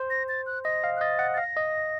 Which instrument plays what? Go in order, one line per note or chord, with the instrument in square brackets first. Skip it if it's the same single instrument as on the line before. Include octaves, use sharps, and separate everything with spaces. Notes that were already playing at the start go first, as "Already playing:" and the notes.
Already playing: [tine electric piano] C5
[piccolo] A#6
A6
F#6
[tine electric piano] D#5 [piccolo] A#6
[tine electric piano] F5
[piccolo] F#6
[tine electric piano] D#5 [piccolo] A6
[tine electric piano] F#5
[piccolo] A6
[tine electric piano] F5 [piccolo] A#6
[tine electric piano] D#5